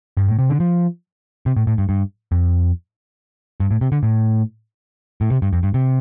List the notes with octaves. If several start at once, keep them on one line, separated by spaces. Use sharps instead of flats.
G2
A2
C3
D3
F3
C3
A2
A2
G2
G2
F2
G2
A2
C3
D3
A2
A2
C3
G2
F2
G2
C3